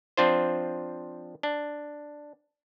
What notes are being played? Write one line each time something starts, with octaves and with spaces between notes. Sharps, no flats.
F3 C4 D4 F4 C5
D4